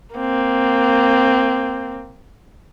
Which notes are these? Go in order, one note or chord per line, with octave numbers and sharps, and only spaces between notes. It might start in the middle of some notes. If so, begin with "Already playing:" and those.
A#3 C4